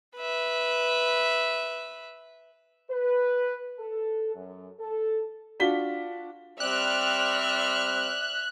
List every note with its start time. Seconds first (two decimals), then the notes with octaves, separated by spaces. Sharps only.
0.17 B4 E5
2.90 B4
3.78 A4
4.35 F#2
4.79 A4
5.60 D4 F4 F#4 B6 G7
6.60 G3 C4 D5 E5 F6 F#6